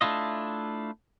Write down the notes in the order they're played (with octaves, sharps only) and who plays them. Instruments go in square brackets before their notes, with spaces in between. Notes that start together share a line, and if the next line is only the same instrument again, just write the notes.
[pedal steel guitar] A3 D4 E4 F4 D#5